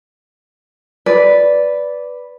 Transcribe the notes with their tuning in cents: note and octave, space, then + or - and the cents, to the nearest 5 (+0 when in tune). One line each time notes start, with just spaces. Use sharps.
B4 +0 D5 -10